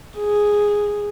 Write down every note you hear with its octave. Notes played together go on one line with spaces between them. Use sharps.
G#4